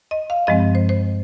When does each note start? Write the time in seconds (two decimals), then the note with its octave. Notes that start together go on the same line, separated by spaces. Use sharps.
0.11 D#5
0.30 F5
0.47 G2 F3 G#3 C4 D#5
0.75 C5
0.89 C5